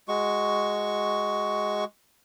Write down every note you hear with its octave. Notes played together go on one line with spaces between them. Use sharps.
G#3 F#4 C#6